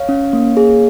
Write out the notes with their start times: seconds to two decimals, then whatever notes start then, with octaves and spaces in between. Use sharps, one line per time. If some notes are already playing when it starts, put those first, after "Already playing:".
Already playing: C#5 F5
0.09 C#4
0.33 A#3
0.57 G#4